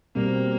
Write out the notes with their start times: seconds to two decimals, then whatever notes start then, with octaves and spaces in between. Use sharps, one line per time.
0.15 B2 G3 A#3 C4